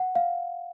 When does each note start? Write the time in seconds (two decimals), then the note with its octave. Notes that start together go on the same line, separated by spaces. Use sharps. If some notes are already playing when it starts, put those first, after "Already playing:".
Already playing: F#5
0.15 F5